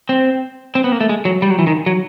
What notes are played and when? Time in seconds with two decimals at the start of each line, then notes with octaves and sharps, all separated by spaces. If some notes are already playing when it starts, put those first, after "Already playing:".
0.09 C4
0.75 C4
0.84 B3
0.92 A#3
1.01 A3
1.09 G#3
1.25 F#3
1.42 G3
1.50 F#3
1.59 E3
1.67 D#3
1.86 F#3